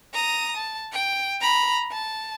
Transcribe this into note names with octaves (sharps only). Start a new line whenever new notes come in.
A#5 D#6
A5
G5
A#5 B5
A5